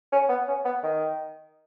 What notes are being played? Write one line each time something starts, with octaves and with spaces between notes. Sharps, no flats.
C#4
B3
C#4
B3
D#3